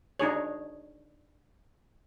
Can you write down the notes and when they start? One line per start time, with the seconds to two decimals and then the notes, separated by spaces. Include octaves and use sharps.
0.19 D4 D#4 G#4 C#5